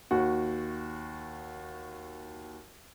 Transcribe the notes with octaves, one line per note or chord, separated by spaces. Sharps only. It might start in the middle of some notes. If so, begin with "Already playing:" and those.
D#2 F#4